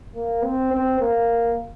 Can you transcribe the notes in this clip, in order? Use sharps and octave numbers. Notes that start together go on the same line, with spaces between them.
A#3
C4
C4
A#3